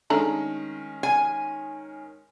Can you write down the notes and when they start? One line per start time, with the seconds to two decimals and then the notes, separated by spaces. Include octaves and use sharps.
0.10 D#3 G#3 A3 C#4 D4 A#5
1.03 G#5